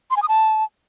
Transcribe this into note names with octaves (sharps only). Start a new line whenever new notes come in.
C6
G#5
D#6
A5